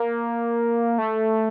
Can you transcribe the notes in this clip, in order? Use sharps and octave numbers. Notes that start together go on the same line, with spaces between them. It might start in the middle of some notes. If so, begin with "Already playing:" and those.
Already playing: A#3
A3